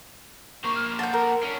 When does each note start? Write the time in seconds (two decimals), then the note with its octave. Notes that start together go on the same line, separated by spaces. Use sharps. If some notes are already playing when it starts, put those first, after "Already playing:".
0.64 A#3 C5 C#6
0.76 F6
0.99 F#5 G5 A5
1.13 A#4
1.43 C#4 D4